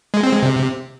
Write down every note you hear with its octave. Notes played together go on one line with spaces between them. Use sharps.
G#3
C4
G#3
C3